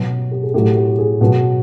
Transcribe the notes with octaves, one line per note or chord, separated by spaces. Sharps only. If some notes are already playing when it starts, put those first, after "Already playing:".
Already playing: B2 F#3
G4
G#4
A2 F#3 G4 A4
G4
G#4
B2 F#3